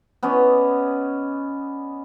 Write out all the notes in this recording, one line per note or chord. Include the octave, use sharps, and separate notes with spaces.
B3 C#4 D5 D#5